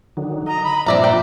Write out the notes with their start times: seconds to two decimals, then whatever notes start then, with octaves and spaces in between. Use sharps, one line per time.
0.17 D3 D#3 F#3
0.46 D#5 A#5
0.63 B5
0.86 G2 A#2 F3 C4 D5 E5 A#5
1.04 G5